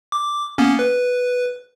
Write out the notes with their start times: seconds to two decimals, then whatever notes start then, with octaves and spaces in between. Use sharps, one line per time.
0.12 D6
0.58 A#3 B3 C#4
0.79 B4